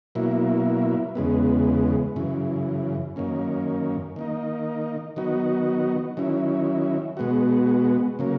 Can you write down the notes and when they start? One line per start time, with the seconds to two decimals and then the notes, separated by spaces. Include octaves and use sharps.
0.15 B2 F#3 A#3 E4
1.15 E2 C#3 G#3 B3
2.16 F#2 C#3 E3
3.16 F#2 D#3 A#3 C#4
4.16 D#3 A#3 D#4
5.16 D#3 F#3 B3 D#4 F#4
6.17 D#3 F#3 C#4 E4
7.17 B2 G#3 B3 F#4
8.19 C#3 F#3 A#3